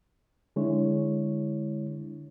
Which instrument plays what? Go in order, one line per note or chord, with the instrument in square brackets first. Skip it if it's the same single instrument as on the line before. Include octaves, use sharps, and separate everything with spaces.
[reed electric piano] D3 G#3 D4 E4 C#5